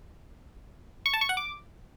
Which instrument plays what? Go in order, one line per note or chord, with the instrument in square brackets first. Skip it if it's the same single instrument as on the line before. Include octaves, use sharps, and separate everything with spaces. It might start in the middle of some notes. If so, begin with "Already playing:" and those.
[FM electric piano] C#6
A5
C#6
F#5
D6